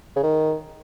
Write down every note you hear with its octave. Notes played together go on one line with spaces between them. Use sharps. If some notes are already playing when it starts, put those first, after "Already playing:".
C#3
D#3